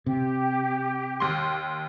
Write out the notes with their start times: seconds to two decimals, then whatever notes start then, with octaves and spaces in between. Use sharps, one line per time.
0.06 C3 G4
1.20 D#2 C6